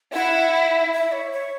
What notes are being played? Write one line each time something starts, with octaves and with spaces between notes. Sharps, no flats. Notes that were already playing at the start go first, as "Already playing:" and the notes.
E4 F#5
E5
E5
C#5
C#5